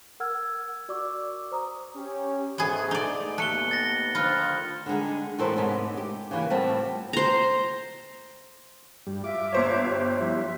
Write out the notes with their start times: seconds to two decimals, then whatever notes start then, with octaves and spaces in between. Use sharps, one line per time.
0.20 A#4 F#5 E6 F6 G#6
0.89 F#4 D5 C#6 D6 E6
1.51 C5 A#5 D#6
1.95 C#4 G4
2.58 G#2 A3 B3 G#4
2.91 D#4 D5
3.38 D#2 A3 B3 F#6 C#7 G7
3.71 A6 A#6
4.15 D3 D#3 F3 F4 B5 F6 F#6
4.86 D3 G3 G#3 D#4
5.38 E2 A2 G3 A4 A#4 C5
5.56 G#2 C3 B3 C#4
5.97 G4
6.31 C#3 E3 A#3
6.50 A2 G3 B3 C4 F4 A5
7.13 C5 A#5
9.07 G2 G3
9.24 F4 E5 D6
9.52 G1 C5 C#5
9.89 G4
10.20 F3 G3 E4 E5